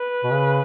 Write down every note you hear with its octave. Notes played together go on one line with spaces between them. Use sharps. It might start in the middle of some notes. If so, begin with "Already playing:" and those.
Already playing: B4
B2
C#3